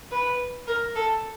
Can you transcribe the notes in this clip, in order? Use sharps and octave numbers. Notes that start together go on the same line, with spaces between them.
B4
A#4
A4